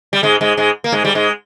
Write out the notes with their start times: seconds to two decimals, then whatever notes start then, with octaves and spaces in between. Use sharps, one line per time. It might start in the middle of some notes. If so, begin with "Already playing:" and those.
0.13 G3
0.23 G#2 G#3
0.41 G#2 G#3
0.57 G#2 G#3
0.84 A#3
0.92 G#2 G#3
1.05 G3
1.15 G#2 G#3